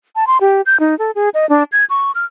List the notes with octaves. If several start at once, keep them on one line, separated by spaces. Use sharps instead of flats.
A5
C6
G4
G6
D#4
A4
G#4
D#5
D4
G#6
C#6
F6